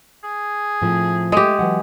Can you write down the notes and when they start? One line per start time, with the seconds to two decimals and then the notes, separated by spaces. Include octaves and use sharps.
0.24 G#4
0.82 A2 F3 C4
1.32 G#3 A3 G4
1.59 E3 F#3 F#5